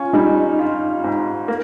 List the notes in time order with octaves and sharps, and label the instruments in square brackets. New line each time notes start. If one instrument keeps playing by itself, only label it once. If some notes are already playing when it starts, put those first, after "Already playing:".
Already playing: [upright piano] C#4 [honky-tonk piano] F4
[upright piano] G3 [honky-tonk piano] D#4
[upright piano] F4
G#2
A#3